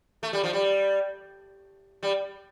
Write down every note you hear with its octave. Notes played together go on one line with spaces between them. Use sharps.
A3
G3
F3
G3
G3